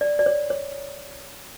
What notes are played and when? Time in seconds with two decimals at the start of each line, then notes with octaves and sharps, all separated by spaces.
0.01 D5
0.19 D5
0.26 C#5
0.50 C#5